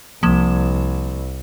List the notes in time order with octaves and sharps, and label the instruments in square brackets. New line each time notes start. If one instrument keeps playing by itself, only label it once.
[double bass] C2 [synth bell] F3 A#3 E7